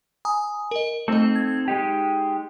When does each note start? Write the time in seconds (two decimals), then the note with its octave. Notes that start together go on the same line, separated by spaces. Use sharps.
0.25 G#5 A#5 D#6
0.71 A#4 D#5
1.08 A3 C4 D#4 A4 D#5
1.36 G#6
1.68 G#3 D#4 G4